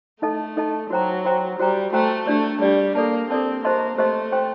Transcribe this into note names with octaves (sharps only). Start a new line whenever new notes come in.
A3 D#4 A4 D#5 A5
D#4 A4 D#5 A5
F#3 F#4 C5 G5 A#5
F#4 C5 G5 A#5
G3 F#4 C5 G5 A#5
A3 F#4 C5 G5 A#5
A3 D4 G4 D5
G3 D4 G4 D5
A#3 A4 D5 A5
C4 A4 D5 A5
A#3 G4 C5 D#5 A5 C6
A3 G4 C5 D#5 A5 C6
C5 G5 C6